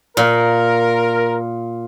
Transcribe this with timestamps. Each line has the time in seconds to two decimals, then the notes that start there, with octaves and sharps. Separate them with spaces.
0.17 A#2 A#4